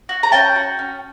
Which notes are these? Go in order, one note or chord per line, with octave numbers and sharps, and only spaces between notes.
F#4
A#5
C#4 G5 A5
F#4
C#4